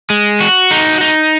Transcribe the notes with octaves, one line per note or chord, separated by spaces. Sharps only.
G#3
F#4
D#4
D#4